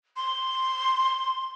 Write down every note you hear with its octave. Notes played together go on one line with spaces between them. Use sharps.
C6